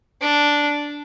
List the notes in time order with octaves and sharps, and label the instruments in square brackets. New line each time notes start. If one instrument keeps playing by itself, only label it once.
[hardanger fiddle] D4